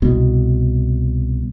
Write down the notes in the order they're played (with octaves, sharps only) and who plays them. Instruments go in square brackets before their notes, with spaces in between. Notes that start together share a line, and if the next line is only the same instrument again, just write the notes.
[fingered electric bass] C2 B2